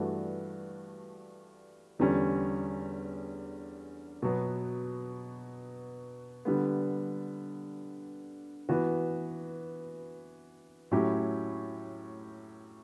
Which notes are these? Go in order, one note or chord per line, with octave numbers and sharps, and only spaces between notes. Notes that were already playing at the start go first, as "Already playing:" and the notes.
Already playing: G2 E3 A3 D4 F#4
E2 D3 G3 C#4
B2 F#3 B3
D3 G3 B3
E3 B3 F#4
A2 F#3 C#4 E4 G4